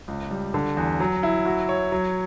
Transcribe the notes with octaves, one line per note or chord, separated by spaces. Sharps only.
C#2
G3
D3
E2
F#3
E4
F#4
C#5
F#3